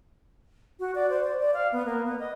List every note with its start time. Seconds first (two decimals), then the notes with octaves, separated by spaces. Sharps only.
0.80 F#4
0.95 D5
1.10 C5
1.24 D5
1.40 D5
1.54 F5
1.72 B3
1.86 A#3
2.05 B3
2.19 D#5